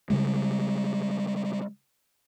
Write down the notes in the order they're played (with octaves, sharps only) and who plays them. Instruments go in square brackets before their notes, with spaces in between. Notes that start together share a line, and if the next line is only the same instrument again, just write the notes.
[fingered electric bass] C#3 G3 G#3